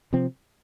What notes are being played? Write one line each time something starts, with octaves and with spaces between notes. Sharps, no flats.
C3 F3 C4